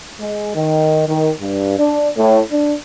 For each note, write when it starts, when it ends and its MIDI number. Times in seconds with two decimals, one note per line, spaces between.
0.19 0.51 56
0.55 1.07 51
1.07 1.31 51
1.41 1.75 43
1.78 2.09 62
2.16 2.40 45
2.51 2.74 62